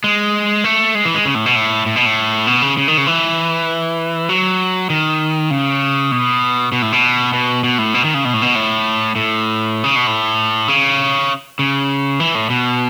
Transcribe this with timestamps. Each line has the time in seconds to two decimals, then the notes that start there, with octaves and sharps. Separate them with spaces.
0.04 G#3
0.64 A3
0.95 G#3
1.05 E3
1.15 G#3
1.25 C#3
1.35 A2
1.46 B2
1.56 A2
1.86 A2
1.96 B2
2.06 A2
2.47 B2
2.62 C#3
2.77 C#3
2.88 D#3
2.98 C#3
3.07 E3
4.29 F#3
4.90 D#3
5.51 C#3
6.11 B2
6.72 B2
6.82 A2
6.92 B2
7.33 B2
7.64 B2
7.78 A2
7.94 B2
8.04 D#3
8.14 C#3
8.25 B2
8.34 A2
8.42 B2
8.55 A2
9.16 A2
9.84 C#3
9.96 B2
10.07 A2
10.68 C#3
11.59 C#3
12.20 E3
12.35 A2
12.50 B2